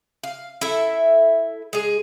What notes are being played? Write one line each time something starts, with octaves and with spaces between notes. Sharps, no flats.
F5
E4 A4 E5
G#3 G#4